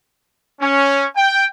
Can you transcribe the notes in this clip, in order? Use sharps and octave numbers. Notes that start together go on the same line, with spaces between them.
C#4
G5